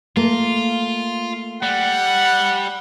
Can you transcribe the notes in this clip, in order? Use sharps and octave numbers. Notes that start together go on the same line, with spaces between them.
A3 A#3 F4
G3 F#5